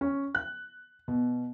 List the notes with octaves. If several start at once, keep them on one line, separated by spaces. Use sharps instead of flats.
C#4
F#6
B2